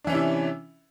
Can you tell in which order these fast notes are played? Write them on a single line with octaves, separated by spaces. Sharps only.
D4 E3 C#4 C3 E4